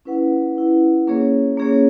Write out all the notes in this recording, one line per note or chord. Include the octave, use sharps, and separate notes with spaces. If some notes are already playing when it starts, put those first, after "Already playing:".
C#4 E4 B4 F#5
C#4 E4 B4 F#5
A#3 C#4 G#4 C#5
A#3 C#4 G#4 C#5